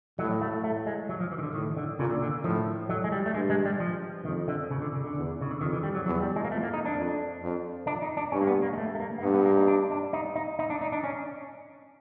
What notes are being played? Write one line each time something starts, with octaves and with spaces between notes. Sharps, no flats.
A2 F#3
A3
A3
G#3
F#3
F3
E3
D#3
D3
A2 D#3
D3
A#2 C#3
D3
D3
A2 F3
F#3
G#3
G3
A3
G2 G#3
G#3
G3
F3
F2 D#3
D3
C#3
D3
C#3
D3
E2
C#3
D3
F2 D#3
E3
G3
F#3
E2 F#3
G3
G#3
A#3
F2 A3
A#3
D#4
D4
F2
F2
D4
D#4
D4
G2 C#4
A#3
B3
A#3
G#3
A3
A3
A#3
A#3
G2 B3
B3
A#3
D#4
D4
D4
D#4
D#4
D#4
D4
D#4
D4
C#4